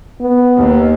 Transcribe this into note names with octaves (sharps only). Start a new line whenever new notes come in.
B3
D#2